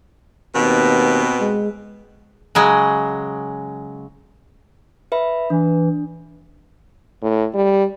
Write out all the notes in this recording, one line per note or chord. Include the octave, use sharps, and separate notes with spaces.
D#2 B2 B3 C4
G#3
C#3 F#3 G#3
B4 E5 B5
E3 D4
A2
G3